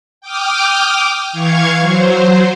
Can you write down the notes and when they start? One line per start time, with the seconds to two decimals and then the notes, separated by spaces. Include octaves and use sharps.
0.21 G5 D6 D#6 F6
1.32 E3 F5 C#6 G#6
1.80 F#3 C5